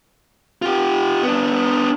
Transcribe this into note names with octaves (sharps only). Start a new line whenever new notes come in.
F4 G4
B3 D4